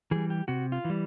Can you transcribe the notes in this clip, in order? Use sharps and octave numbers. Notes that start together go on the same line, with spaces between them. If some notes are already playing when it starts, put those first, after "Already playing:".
E3 G3 G#4
G4
C3 F#4
F4
E3 G3